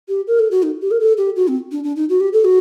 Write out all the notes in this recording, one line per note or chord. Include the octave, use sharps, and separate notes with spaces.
G4
A#4
A4
F#4
D#4
G4
A#4
A4
G4
F#4
C4
D4
D4
D#4
F#4
G4
A4
F#4